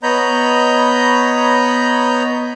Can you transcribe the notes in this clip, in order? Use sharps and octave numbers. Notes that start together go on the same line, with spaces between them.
B3 C#5 D#5 A#5 B5 G6